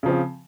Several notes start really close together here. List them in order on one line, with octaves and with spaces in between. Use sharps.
C#3 F3 C4